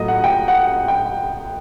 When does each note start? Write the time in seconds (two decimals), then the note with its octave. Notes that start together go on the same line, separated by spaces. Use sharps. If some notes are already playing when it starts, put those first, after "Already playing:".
Already playing: A2 F#3 A3 D#5
0.08 F#5
0.24 G5
0.48 F#5
0.73 F#5
0.88 G5